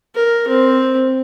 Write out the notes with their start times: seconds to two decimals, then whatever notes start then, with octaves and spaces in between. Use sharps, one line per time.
0.15 A#4
0.48 C4